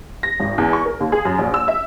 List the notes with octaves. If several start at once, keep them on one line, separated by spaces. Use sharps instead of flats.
A#6
G#1
E2
C#6
A#4
D#2
G#4
F#2
A#1
E6
E5